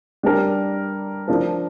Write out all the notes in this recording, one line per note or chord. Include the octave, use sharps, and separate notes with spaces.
G3 D4 A#4
F3 D4 A#4